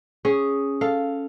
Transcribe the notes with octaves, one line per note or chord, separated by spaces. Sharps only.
C#4 G#4
A4 F5